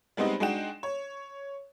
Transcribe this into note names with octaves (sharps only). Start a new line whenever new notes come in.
G3 G#3 B3 C4 D#4
G#3 D4 D#4 F#4 G5 E7
C#5